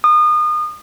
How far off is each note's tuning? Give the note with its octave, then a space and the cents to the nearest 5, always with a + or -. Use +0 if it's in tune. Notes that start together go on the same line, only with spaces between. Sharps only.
D#6 -35